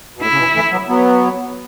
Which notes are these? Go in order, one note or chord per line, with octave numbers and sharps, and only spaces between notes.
B2
A2 E4
C#3
B2 E3
E3 A3
F#3 B3
F#3 B3